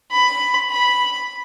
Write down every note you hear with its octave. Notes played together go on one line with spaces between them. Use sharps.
B5
B5